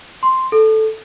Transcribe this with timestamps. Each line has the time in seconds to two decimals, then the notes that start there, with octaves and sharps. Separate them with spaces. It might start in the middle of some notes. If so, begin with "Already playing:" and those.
0.23 C6
0.52 A4